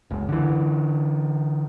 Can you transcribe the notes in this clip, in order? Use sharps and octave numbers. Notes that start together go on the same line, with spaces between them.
F#1 C#2
D3 E3